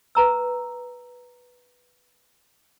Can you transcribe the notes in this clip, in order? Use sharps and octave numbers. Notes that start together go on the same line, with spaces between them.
B4 A#5 E6